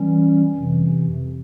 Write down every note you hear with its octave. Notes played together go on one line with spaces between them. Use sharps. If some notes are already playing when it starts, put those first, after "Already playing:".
Already playing: E3 G3 C#4
F2 C3 E3